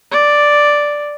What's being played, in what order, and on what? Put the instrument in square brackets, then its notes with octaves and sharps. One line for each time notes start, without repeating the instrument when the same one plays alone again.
[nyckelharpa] D5